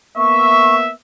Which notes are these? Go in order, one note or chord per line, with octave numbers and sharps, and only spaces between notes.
A#3 B3 E5 C#6